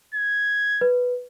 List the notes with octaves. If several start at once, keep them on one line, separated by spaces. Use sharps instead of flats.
G#6
B4